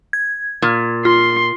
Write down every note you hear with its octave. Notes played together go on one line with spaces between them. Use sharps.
G#6
A#2
F4 C6